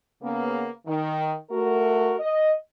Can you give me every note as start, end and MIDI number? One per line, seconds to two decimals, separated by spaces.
0.22 0.66 49
0.22 0.66 58
0.22 0.66 59
0.86 1.32 51
1.50 2.14 57
1.50 2.14 66
1.50 2.14 70
2.20 2.51 75